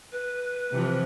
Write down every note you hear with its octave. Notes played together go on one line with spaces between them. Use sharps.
B4
C3 E3 F3